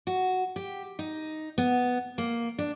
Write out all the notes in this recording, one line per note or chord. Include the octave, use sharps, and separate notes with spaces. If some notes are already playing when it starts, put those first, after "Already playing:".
F#4
G4
D#4
B3
A#3
D4